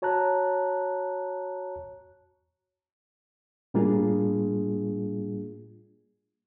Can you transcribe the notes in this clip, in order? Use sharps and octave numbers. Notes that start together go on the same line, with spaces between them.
F#4 C#5 A5 A#5 F#6
A2 G3 A#3 D4 F4 G#4